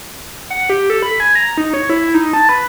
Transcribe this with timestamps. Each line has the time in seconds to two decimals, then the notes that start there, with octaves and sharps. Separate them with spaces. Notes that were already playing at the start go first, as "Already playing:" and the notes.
0.50 F#5
0.70 G4
0.90 A4
1.02 B5
1.20 G#5
1.35 A#5
1.58 D#4
1.74 C#5
1.90 E4
2.14 D#4
2.33 A5
2.49 B4